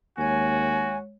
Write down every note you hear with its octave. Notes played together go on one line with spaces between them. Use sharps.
D#2 G#3 F#4 C#5 G#5